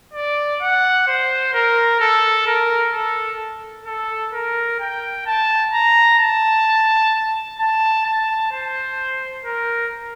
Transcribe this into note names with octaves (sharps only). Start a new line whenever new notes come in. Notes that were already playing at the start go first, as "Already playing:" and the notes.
D5
F#5
C5
A#4
A4
A#4
A4
A4
A#4
G5
A5
A#5
A5
A5
A5
C5
A#4